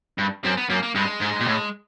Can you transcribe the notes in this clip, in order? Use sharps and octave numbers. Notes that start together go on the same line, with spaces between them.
G2
F#2 C4
B3
F#2 A#3
A#3
G2 G#3
G#2
A#2
A2